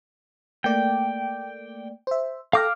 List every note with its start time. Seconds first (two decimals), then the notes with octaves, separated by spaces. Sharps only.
0.64 A3 A#3 D5 G5
2.07 C5 E5
2.53 A4 F5 G5 D6 F6 A#6